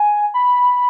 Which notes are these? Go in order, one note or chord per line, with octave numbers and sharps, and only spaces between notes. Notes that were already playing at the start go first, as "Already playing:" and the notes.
Already playing: G#5
B5